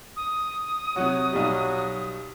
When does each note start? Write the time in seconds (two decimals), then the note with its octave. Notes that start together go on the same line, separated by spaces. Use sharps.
0.16 D#6
0.96 C3 F#3 F#4 C#5
1.33 B1 F#3 G3